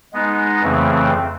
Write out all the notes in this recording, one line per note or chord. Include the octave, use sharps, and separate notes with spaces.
G#3 B3 D#4
F2 C#3 E3 A3 C4